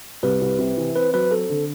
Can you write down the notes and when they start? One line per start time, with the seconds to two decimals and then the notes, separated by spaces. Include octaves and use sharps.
0.23 C2 B4
0.41 C2
0.59 C3
0.77 E3
0.95 C4 B4
1.13 F#3 B4
1.31 C4 A4
1.49 D3